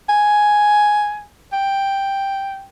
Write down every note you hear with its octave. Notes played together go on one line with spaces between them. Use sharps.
G#5
G5